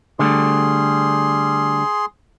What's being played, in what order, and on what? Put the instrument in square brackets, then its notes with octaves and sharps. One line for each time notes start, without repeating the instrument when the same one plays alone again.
[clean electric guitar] D3 G3 A3 [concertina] G#4 C6